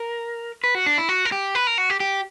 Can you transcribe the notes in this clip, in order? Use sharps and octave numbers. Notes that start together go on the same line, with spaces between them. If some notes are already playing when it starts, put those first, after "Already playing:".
Already playing: A#4
B4
F#4
D4
E4
F#4
A#4
G4
B4
A#4
F#4
G4
G4